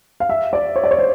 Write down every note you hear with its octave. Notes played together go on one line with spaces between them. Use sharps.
F5
E5
D5
C#5
D5
C#5
C5